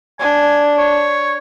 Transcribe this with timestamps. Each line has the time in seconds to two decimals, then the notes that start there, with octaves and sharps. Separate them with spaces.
0.19 D4 G#5
0.78 C#5